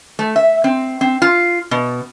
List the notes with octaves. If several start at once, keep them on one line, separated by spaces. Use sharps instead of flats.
A3
E5
C4
C4
F4
B2